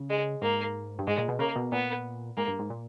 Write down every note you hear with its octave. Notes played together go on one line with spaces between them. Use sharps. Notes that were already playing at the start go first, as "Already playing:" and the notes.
Already playing: C#3
G#3
G#2 A#3
G2
G#2 G#3
A#2
B2
C#3 A#3
B2
A#2 B3
G#2 A#3
G2
G#2
A#2